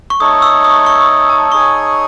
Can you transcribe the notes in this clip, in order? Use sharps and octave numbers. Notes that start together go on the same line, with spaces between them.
C#6
A3 D#4 A4 C#5 D#6
E6
D#6
C#6
A5
D#4 G#4 C#5 G#5 C#6